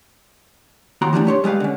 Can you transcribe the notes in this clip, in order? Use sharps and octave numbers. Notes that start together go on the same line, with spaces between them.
D#2 F#4 A#5 C6
E3 G3 A3 C#4 D4
G4 C#5 C6
G3 G#3 B4 F5
D3 C#4